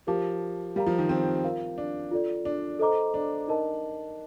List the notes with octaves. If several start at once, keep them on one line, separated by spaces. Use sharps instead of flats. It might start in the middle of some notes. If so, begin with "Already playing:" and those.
F3 G4 A#4 F5 A5 D6
G3 G4 A#4 F5 A#5
F3
D#3
C4
F4 A#4 F5
D4
F4 A4 D5
D4
A4 C5 D#5 A#5 D6
D4
D#4 A#4 D#5 A5